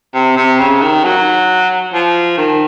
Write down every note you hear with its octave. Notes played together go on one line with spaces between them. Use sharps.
C3
C3
C#3
D#3
F#3
F3
D#3